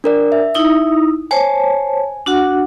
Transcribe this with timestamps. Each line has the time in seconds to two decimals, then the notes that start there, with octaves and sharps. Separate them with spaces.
0.04 D4 A#4 D5
0.32 E5
0.55 D#4 E4 D#6
1.31 C5 C#5 G#5 A5
2.26 D4 F#4 F#5